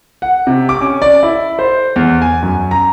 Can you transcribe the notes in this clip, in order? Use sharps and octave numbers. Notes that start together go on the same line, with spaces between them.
F#5
C3
D6
C#4
D5
E4
C5
E2
G#5
F#2
A#5